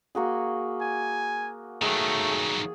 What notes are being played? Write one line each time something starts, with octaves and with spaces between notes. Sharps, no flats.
A#3 F#4 G#4
G#5
D#3 F#3 A3 G#4
G#4